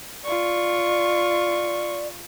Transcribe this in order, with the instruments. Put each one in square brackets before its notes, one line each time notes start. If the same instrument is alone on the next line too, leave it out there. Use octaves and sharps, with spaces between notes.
[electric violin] F4 C#6 [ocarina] D5